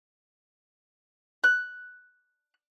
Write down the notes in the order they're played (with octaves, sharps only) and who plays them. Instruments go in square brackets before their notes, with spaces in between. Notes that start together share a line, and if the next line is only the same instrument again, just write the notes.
[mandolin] F#6